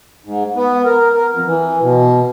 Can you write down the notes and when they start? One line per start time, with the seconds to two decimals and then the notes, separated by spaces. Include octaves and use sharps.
0.25 G#2
0.56 B3
0.85 A#4
1.15 A#4
1.32 F2
1.46 E3
1.81 B2